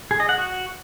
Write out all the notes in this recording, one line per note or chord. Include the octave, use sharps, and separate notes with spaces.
G#4
D#5
F#5
F#4